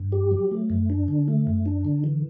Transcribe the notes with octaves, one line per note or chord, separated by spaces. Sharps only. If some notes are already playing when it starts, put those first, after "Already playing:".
Already playing: G2
G4
F#3
A3
F#2
D4
D3
A3
F#2
D4
D3
E3